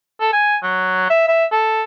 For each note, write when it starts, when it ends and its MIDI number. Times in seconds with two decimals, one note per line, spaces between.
0.20 0.29 69
0.33 0.57 80
0.63 1.06 54
1.10 1.23 76
1.28 1.45 76
1.52 1.84 69